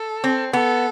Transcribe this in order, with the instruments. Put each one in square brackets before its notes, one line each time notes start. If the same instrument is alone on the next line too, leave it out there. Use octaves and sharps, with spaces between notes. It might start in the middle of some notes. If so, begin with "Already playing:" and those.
Already playing: [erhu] A4
[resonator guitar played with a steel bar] C4
[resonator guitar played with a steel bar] B3 [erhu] A4